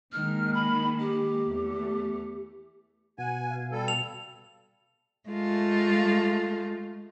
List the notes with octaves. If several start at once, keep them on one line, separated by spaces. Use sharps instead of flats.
D#3 G#3 A#3 F6
B5
G4
E2 A3
B2 F#5 G#5
F5
G3 A4
F7
G#3 A3 F4